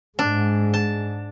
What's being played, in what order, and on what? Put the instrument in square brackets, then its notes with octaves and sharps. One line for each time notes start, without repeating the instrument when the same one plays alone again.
[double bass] G#2 G#3 [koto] D4
[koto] A5